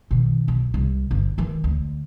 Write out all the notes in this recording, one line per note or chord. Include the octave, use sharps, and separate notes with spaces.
B2 D#3
B1
C2
G1
D#3 E3
D2